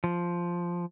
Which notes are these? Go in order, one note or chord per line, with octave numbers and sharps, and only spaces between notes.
F3